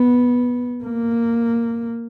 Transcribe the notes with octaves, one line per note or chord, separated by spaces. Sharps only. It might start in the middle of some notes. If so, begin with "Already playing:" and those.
Already playing: B3
A#3